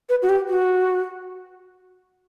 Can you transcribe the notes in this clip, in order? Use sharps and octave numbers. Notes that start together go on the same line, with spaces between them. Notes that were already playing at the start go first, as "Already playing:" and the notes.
B4
F#4
G4
F#4